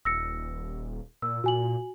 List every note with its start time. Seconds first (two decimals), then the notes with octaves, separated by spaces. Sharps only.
0.05 D#1 E6 A#6 C#7
1.22 A#2 E6
1.44 A#2 F#4 G#5 F#7